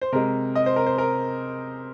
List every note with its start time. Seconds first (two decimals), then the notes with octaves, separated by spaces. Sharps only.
0.01 C5
0.12 C3 G#3 A#4
0.55 D#5
0.66 C5
0.76 A#4
0.86 C5
0.98 A#4